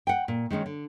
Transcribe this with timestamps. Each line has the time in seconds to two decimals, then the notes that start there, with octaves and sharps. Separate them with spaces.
0.07 F#5 G5
0.28 A#2
0.50 D#3 G#3 C#4 D#4
0.66 D3